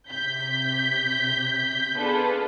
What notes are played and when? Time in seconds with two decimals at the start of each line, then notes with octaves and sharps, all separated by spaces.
0.10 C3 G6 B6
1.97 B3 D4 F4 G#4 A4 B4